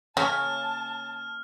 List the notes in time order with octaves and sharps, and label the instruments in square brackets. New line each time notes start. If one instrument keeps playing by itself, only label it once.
[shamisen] C#3 [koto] A#3 C#4 [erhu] A5 [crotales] F6